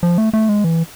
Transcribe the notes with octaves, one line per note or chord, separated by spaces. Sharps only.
F3
A3
A3
G#3
E3